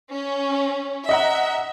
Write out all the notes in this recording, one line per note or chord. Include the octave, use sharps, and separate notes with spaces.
C#4
D#5 E5 F#5 A#5